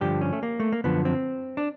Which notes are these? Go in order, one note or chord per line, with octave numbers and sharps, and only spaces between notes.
G2 D3 F3 G4
C#4
A3
A#3
A3
A#3
F#2 D3 F3 B3
C4
D4